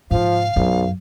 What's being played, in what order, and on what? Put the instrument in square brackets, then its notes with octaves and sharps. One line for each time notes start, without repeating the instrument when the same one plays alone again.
[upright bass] G#2 C3 [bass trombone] F3 [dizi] F5
[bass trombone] B1 [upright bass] F#2